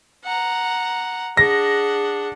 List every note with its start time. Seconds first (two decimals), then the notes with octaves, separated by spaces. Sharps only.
0.25 F#5 A#5
1.37 D4 G#4 F#5 A#6